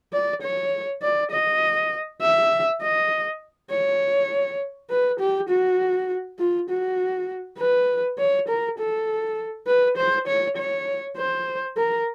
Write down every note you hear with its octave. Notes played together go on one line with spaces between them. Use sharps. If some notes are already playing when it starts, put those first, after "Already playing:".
D5
C#5
D5
D#5
E5
D#5
C#5
B4
G4
F#4
F4
F#4
B4
C#5
A#4
A4
B4
C5
C#5
C#5
C5
A#4